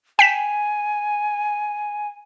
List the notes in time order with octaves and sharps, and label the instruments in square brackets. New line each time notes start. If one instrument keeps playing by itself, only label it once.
[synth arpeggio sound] G5 B6 E7 [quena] G#5